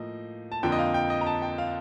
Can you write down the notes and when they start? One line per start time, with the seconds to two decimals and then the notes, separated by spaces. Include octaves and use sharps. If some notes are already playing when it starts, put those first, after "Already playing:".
Already playing: A2 F3 A#3 D#5
0.52 A5
0.63 F2 D3 F3 A#3 G5
0.72 D#5
0.79 F5
0.94 G5
1.10 D#5
1.21 A#5
1.26 A5
1.42 G5
1.58 F5